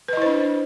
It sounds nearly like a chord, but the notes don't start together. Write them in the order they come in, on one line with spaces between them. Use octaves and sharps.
B4 D#5 E4 C5 D4